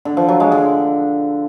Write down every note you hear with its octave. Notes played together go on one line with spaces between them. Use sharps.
D3
F3
F#3
G#3
D3